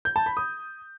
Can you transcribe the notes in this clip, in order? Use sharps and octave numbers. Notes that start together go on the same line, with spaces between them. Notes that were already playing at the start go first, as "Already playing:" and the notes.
G6
A5
B5
D#6